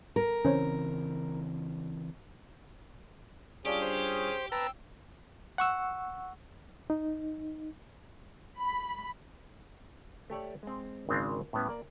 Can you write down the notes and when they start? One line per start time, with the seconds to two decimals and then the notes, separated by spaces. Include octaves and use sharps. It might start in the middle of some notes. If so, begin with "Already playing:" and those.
0.16 A#4
0.45 C#3 E3 C4 C#4 C5 C#5
3.65 G3 C#4 D4 F4 G4 G#4
3.82 C5
4.52 B4 G5 A5 A#5 E6
5.58 F#5 C#6 E6
6.90 D#4
8.61 B5
10.30 A3 G4 C#5 D5
10.63 G#3 C4
11.09 G#1 C#3 G#3 C4 D4 F5
11.53 A2 G3 B3 C#4
11.69 A#3 D5